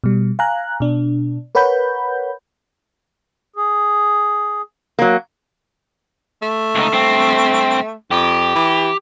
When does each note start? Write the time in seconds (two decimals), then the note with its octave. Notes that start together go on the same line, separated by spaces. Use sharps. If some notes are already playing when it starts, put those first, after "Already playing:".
0.04 B2 G3
0.39 F5 G#5 A#5 F#6
0.80 B2 D4
1.55 A#4 B4 C#5 F#5 B5 G6
3.56 G#4
4.99 F#3 A#3
6.42 A3
6.75 C#2 D#4
6.93 G2 C4
8.11 F2 G4
8.55 E3